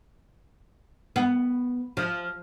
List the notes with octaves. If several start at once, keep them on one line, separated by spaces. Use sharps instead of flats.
B3
F3